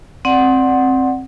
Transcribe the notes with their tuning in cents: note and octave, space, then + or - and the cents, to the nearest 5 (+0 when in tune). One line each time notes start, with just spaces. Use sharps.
C4 +15 D5 +0 F#5 +0